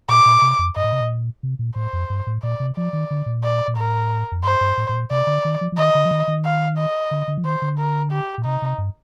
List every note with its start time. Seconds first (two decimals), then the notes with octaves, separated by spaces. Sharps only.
0.09 A#2 D6
0.26 A#2
0.42 C3
0.59 F2
0.76 G2 D#5
0.84 A2
0.92 C3
1.01 A#2
1.43 C3
1.59 A#2
1.76 A2 C5
1.93 F2
2.10 G2
2.27 A2
2.43 A#2 D5
2.60 C3
2.76 F3 D5
2.93 D#3
3.11 D3
3.26 A#2
3.43 D5
3.68 A#2
3.77 A2 A#4
4.32 F2
4.44 G2 C5
4.61 G2
4.78 A2
4.89 A2
4.93 A#2
5.11 C3 D5
5.27 D3
5.45 D#3
5.61 F3
5.72 F3
5.77 D#3 D#5
5.95 D3
6.05 F3
6.11 D#3
6.28 D#3
6.44 F5
6.78 D#5
7.11 D3
7.28 D3
7.38 F3
7.44 D#3 C5
7.62 D3
7.78 A#4
8.11 G4
8.38 A#2
8.45 C3 D#4
8.62 C3
8.78 G2